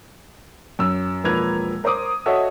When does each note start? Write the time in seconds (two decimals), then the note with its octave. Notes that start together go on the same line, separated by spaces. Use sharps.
0.79 F#2 E6
1.24 E1 F3 A#3 B4 G#6 F7
1.84 A#4 C5 A#5 D6 D#6
2.26 F#4 A4 C#5 D#5 E5